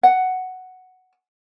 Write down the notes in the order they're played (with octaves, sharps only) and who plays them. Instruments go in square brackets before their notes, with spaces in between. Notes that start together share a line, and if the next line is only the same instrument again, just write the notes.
[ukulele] F#5